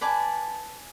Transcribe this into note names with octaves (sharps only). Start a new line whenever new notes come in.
B4 D5 G#5 A5